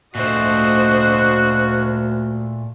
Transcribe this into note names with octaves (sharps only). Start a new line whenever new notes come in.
D2 A#2 A3 D4 F#4 C5 D#5